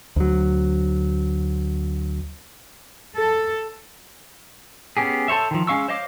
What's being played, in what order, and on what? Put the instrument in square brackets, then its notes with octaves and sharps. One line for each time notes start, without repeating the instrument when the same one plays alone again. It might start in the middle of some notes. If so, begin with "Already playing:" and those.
[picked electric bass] D2 F#3
[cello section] A4
[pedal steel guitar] B3 C#4 G4 G#4
A4 C5 C#5 E5
D#3 F3
G#3 C#4 F5 C#6 E6
C5 C#5 D#5 F5 D6